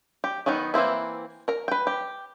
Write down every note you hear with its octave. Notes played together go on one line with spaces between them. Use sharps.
G4
D#3 F#3 B3 D#4
E3 A#3 C4 E4
A#4 A#5
B4 G5
G4